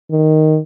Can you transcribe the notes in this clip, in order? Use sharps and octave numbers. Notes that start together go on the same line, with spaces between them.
D#3